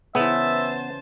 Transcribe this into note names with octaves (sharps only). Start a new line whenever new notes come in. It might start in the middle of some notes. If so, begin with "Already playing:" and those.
C#3 E3 B3 C5 E5 A5